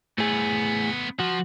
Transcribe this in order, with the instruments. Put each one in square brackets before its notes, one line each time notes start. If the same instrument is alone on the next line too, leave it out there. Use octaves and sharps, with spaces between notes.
[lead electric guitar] A2 G#4 [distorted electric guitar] A3 B3
[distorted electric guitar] F3 [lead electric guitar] F#4